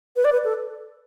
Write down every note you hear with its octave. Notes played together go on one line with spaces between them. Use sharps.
B4
D5
B4
A4